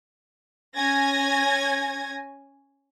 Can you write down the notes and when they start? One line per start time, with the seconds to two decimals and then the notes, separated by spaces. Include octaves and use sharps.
0.75 C#4 G#5 G#6 A#6